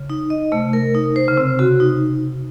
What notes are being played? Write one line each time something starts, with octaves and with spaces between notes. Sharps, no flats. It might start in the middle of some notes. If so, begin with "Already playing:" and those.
Already playing: C#3
D#4
D#5
C3 A3
A#4
D#4
C5
C#3
C3 C4
C#3 F#4
D#4